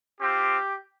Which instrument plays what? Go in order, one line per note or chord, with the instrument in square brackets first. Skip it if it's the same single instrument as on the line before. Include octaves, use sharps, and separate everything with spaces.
[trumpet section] C4 F4 G4